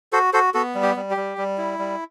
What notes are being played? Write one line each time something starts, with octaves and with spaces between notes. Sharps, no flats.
F#4 A4 C5
F#4 A4 C5
B3 F#4 A4
G3
G4
G3
G4
G3
G3
E4
G3